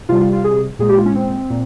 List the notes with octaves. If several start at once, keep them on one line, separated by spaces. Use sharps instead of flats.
C3 G3 F4
F4
F4
G#4
A#2 G#3 G#4
G4
F4
C#4
C4
A#2